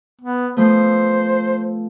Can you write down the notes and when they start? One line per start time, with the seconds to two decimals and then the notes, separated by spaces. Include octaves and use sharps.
0.21 B3
0.57 F3 A3 B3 C5